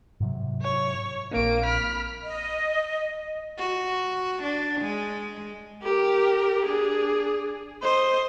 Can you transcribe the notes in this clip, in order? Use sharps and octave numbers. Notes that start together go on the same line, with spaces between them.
G#2 C3 F#3
C#5 C#6
A#1 A#3 C4 D4 D7
B5 F6
D#5
F#4
D4
G#3
G4 A#4
D4 G#4
C5 D#5